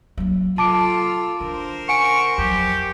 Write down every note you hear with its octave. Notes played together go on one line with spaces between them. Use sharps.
F#3 A#3
F4 A4 A5 D6 D7
D3 A#4 C5
F#5 G#5 C#6 D7
F2 F#3 G4